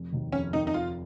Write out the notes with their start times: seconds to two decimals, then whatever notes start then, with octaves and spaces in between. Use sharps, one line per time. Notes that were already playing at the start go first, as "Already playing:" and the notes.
Already playing: F1
0.12 D#2 D#3
0.32 F1 C#4
0.53 D#2 D#3 D#4
0.67 D#4
0.74 F1 F4